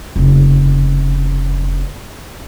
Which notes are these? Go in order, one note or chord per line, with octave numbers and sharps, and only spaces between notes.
F1 C#3